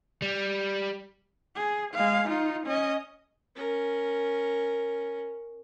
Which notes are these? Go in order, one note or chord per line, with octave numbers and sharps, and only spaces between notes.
G3
G#4
G#3 F5
D#4 F4
C#4 D#5
C#4 A#4